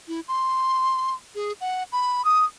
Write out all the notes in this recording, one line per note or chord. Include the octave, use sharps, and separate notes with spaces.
E4
C6
G#4
F#5
B5
D#6